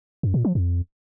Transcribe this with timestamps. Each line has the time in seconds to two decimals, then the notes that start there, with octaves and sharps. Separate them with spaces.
0.23 F#2
0.34 A#2
0.45 F3
0.55 F2